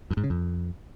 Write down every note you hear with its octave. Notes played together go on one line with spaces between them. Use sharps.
F#2
G#2
C#3
F2